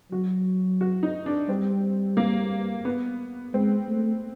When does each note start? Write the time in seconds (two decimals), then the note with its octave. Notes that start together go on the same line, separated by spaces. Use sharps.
0.11 F#3 F#4
0.81 F#4
1.03 D#4
1.26 D4
1.49 G3 C4
2.17 A#3
2.85 B3
3.54 G#3 C4
3.88 A3